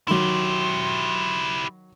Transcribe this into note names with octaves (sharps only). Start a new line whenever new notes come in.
D#3 F#3 E4 G4 C6